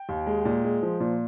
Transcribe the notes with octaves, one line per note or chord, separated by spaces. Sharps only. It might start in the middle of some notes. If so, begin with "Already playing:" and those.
Already playing: G5
D#2
G#3
A#2
G#3
F3
A#2